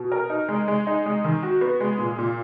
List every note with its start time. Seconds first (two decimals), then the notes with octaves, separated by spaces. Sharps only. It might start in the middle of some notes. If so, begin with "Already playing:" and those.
Already playing: B2
0.12 A#4
0.30 D#4
0.49 G#3
0.68 G#3
0.87 D#4
1.06 G#3
1.24 D#3
1.43 F#4
1.61 B3
1.80 G#3
1.99 A#2
2.18 A#2